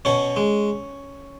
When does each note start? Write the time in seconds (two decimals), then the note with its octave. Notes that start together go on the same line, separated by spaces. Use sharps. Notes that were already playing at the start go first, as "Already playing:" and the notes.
0.05 B2 C#4 C#5
0.36 G#3